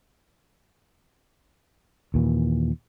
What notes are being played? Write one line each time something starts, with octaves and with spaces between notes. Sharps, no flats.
D#2 A#2 E3